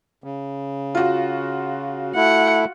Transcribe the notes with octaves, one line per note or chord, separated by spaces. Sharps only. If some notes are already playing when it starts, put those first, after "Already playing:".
C#3
F4 F#4
A3 E4 F#5